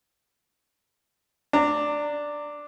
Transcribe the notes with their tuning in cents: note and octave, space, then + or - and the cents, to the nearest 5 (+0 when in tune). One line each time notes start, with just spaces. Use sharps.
D4 +0 A#5 -30